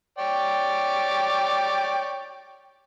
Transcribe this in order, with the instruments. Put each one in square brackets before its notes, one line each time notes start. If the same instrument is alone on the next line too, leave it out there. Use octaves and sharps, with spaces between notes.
[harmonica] C#5 D5 G5